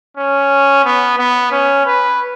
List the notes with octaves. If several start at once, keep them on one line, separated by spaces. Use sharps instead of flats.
C#4
B3
B3
C#4
B4